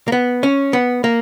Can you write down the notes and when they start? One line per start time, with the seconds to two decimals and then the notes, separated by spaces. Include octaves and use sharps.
0.08 A#3
0.12 B3
0.43 C#4
0.73 B3
1.04 A#3